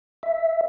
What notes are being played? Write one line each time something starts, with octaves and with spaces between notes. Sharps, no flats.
E5